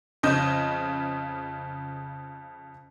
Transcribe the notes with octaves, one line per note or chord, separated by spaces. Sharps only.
F2 C#3 D#5 G6